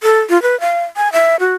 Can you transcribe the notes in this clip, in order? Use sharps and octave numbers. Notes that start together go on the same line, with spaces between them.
A4
F4
B4
F5
G#5
E5
F#4